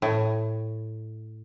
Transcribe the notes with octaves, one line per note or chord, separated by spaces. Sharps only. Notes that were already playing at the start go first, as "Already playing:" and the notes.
A2